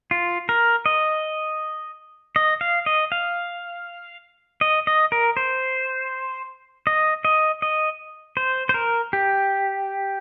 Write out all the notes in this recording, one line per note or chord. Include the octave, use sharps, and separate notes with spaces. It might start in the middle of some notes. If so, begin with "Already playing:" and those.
F4
A#4
D#5
D#5
F5
D#5
F5
D#5
D#5
A#4
C5
D#5
D#5
D#5
C5
C5
A#4
G4